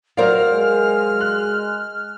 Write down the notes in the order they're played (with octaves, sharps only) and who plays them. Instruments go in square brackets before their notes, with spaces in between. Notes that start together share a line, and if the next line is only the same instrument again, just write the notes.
[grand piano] F#3 C5 F5 [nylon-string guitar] A#4 D5 [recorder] F6
[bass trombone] G#3
[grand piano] F#6